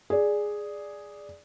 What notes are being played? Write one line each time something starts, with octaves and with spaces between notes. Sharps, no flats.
G#4 D5